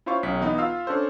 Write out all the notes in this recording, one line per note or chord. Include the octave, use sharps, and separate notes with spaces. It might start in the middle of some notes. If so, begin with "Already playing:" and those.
C#4 E4 F4 C5 F5 C#6
B1 C#4 B6
E3 B3 D#4
F4 F5 E6
C#4 D4 A4 C5